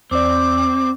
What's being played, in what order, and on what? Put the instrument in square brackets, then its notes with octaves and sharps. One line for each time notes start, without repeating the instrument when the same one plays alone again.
[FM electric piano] E2 D5 [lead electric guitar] C4 [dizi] D6